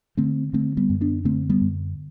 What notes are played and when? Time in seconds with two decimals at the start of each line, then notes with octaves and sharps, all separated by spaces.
0.17 D3 A3 C4
0.53 D3 A3 C4
0.77 G3 B3
0.90 F#2
1.01 B3 D4
1.25 D3 A3 C4
1.49 G3 B3
1.61 F#2